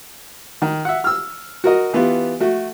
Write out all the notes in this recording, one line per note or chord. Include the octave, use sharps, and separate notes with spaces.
D#3
E5 F#5
E6 F6
F#4 A#4 D#5
E3 B3 F4 G4
A3 F#4